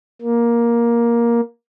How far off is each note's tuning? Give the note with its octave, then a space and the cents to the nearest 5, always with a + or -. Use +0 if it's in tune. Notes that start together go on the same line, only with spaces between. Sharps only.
A#3 +10